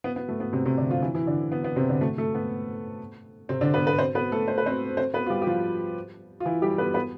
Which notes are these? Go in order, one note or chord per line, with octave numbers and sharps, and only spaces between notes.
B3
B3
A3
B3
C3 C4
C3 C4
D3 D4
F3 F4
E3 E4
E3 E4
D3 D4
B3
B3
C3 C4
D3 D4
A3 A4
A3 A4
B3
C3 C4
D3 D4
B3 B4
B3 B4
C4 C5
B3 B4
A3 A4
C5
B4
C4 C5
C4 C5
B3 B4
F4
G3 G4
G4
F3 F4
F4
E3 E4
G3 G4
B3 B4
B3 B4